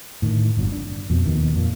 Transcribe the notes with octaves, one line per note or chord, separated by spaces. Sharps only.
A2 D3 D#3
G1 F2 F#3
D4
F2 B2
D#2 B2 D#3
F2 A#2